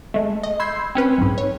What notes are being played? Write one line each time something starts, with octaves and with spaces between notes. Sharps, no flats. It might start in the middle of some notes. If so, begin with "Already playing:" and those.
G#3 A3
D#5
B5 C6 E6 G6 G#6 C7
C4 C#4 B4 B5
B1 G#2
C#5